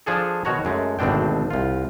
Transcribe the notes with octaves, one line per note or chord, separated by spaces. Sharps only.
F3 D4 G#4 A4
B2 D#3 F#4 C#5 A#5
F#2 G#3 A3
G#1 D2 B2 C4 D4 G5
C2 F4